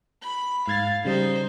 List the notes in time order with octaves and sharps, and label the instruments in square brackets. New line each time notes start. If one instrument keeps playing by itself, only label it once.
[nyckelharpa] B5
[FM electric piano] G#2 G#6 A6 [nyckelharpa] F5
[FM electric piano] C#3 G3 [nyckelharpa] D#4 C5